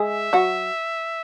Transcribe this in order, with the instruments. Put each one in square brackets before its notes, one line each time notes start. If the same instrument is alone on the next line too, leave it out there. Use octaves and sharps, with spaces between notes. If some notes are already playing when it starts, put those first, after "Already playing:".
Already playing: [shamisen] G#3 G#4 [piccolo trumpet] E5
[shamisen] F#3 F#4